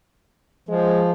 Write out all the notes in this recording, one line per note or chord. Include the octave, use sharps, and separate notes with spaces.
F3 G#3